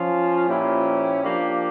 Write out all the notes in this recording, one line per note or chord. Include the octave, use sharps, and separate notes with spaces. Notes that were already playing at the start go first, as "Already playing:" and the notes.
Already playing: F3 C#4 F4
A#2 F3 C#4 E4 G4
F3 A#3 D4 G4